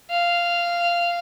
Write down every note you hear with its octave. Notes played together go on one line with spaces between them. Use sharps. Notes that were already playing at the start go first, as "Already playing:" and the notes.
F5